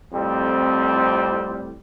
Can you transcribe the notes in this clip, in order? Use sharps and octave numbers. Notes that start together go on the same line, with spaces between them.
F2 A2 G3 C4